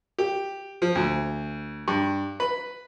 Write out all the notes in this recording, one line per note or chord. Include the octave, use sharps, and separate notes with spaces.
G4
F3
D2
G2
B4